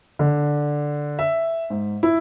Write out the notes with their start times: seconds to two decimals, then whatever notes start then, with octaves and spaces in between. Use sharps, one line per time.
0.19 D3
1.19 E5
1.70 G#2
2.03 E4